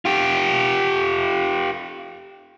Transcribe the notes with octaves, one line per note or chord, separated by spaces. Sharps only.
F4 G4